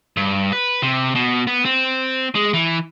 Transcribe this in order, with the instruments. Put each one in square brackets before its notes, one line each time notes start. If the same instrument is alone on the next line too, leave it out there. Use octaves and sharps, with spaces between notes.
[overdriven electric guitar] G2
B4
C3
B2
B3
C4
G#3
E3